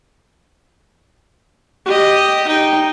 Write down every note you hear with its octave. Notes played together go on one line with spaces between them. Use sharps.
G4 D#5
D#4 G5